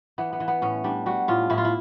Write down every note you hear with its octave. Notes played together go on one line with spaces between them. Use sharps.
E3 B3
B3
E3
B3
A2 C#4
G3 D4
G3 F#4
A2 F4
A2 E4
F4
E4